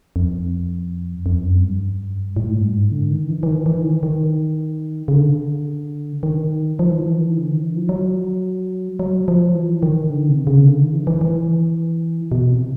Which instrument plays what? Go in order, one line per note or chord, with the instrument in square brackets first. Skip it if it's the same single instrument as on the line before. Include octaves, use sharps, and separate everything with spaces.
[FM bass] F2
F2
F#2
G2
A2
G#2
G2
G#2
D3
D#3
E3
E3
D#3
E3
D#3
D#3
C#3
D3
D#3
F3
E3
D#3
E3
D3
D#3
E3
F3
F#3
F#3
F3
E3
D#3
D3
C3
C#3
D3
D#3
E3
E3
E3
B2
C3